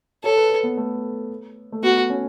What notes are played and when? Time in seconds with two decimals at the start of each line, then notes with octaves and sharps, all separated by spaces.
0.24 A4 C#5
0.36 B4
0.50 B4
0.63 B3
0.77 A3
1.72 A3
1.83 B3 F#4
2.10 C#4